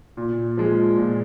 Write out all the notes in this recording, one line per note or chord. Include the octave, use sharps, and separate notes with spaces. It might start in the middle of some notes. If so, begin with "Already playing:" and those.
A#2
F3 G#3
A#2